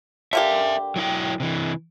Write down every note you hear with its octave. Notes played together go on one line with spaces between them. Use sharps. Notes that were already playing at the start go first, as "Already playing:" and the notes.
D3 A#3 G4 A#4 E5
F#3 E4 G5
C3 E3